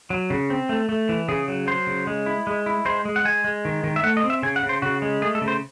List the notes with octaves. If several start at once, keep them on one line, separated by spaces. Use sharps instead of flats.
F#3
C#3
C4
A3
A3
E3
C#3 G#4
F#3
F#3 C5
C#3
G#3
E4
G#3
E4
G#3 C5
G#3
F#5
G#3 G#5
G#3
D#3
D#3
E5
A3 F#5
D#5
C4
E5
C#3 G#5
F#5
C#3
C5
C#3 F#4
G#3
A3 G#4
A4
C#3
C5